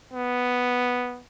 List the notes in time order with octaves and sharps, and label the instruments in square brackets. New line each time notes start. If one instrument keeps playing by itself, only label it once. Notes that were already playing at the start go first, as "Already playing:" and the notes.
[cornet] B3